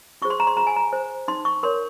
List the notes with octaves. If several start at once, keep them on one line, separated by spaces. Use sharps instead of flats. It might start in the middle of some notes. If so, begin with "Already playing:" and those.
F4 G#4 C5 C#6
C6
A#5
C6
F4 A#5
G#5
A#5
C5
D#4 C6
C#6
A#4 C#5 C6